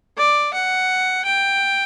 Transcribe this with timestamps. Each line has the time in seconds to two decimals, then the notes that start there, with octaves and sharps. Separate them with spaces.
0.17 D5
0.54 F#5
1.25 G5